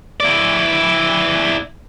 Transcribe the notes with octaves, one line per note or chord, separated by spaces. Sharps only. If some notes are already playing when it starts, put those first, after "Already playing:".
E4 D5